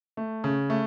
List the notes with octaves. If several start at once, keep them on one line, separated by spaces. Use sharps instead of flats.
A3
C#3
A3